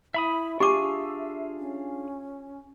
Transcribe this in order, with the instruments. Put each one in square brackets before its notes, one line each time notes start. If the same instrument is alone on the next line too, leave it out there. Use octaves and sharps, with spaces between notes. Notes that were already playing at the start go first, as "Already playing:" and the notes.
[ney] E4 [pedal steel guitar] E5 B5 D#6
[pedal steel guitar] D4 F4 G#4 [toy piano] G4 D6 [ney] E5
[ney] C#4